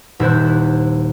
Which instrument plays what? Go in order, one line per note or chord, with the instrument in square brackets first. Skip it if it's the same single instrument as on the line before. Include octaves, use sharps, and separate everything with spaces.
[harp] D#1 E4 C5 F#6